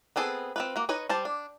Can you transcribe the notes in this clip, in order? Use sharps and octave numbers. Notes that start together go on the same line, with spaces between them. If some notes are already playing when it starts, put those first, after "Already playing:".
B3 C4 G#4 A4 B4
C4 F4 B4
A#3 F#4
D#4 B4 C#5 D#5
G3 C5 A5
D4